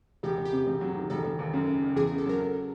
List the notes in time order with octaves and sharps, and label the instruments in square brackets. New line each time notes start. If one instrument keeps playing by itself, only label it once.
[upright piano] E1 [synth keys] G4
[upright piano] E1
[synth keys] G4
[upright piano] C3
E1
F#3
D#3
[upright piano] E1 [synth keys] A4
[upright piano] E1
D#2
F#2
C#3
F#1
[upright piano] E2 [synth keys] G#4
[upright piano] C#3 [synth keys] G#4
[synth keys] A4
[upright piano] F#3 [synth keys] A#4
[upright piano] C#3